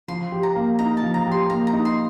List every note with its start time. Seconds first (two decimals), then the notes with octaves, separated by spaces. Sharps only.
0.08 F3 C6
0.32 G4
0.43 A#5
0.56 A#3
0.79 D#4 A#5
0.97 A5
1.02 F3
1.14 A#5
1.26 G4
1.32 C6
1.49 A#3 A#5
1.67 A#5
1.73 D#4
1.85 C6